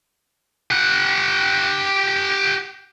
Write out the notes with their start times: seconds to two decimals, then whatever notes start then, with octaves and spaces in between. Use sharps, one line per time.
0.71 G4 F#5